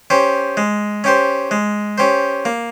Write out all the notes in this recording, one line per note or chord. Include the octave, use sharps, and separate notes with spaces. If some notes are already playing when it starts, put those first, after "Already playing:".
C#4 G4 C5
G#3
C#4 G4 C5
G#3
C#4 G4 C5
A#3